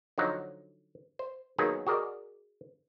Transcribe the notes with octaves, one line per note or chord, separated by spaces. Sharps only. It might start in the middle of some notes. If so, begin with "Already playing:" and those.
D3 F3 F#3 D#4
C5
D#3 F#3 A#3 B3 D#4 G#4
F#4 G#4 A#4 D5 D#5